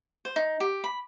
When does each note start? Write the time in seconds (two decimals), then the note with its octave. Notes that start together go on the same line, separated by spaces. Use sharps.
0.25 C5
0.36 D#4
0.60 G4
0.84 B5